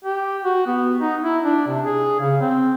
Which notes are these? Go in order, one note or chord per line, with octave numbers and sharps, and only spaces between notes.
G4
F#4
B3
D#4
E4
D4
C3
G#4
C#3
C4